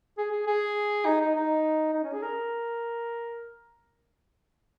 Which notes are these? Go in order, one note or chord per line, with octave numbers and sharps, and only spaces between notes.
G#4
G#4
G#4
D#4
D#4
D#4
D#4
C#4
G#4
A#4